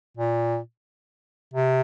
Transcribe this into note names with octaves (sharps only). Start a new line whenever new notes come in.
A#2
C3